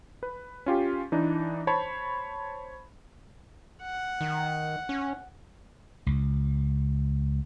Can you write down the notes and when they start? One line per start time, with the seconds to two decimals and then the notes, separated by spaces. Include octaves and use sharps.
0.23 B4
0.66 C#4 F4 G4
1.12 E3 D4 D#4
1.67 C5 C#5 A5 B5
3.82 F#5
4.21 D#3
4.89 C#4
6.06 C#2